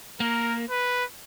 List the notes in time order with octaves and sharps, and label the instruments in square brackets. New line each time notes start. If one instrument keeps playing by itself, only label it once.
[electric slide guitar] A#3 [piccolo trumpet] A#4
[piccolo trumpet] B4